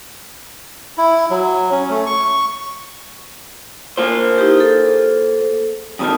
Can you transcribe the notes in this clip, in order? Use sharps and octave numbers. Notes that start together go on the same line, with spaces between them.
E4
F#3
C#4
A3
C#6
A#3 F4 C5
D#4 E4 G4
G#4 A4
F2 B2 D#3 C4 A5 D#6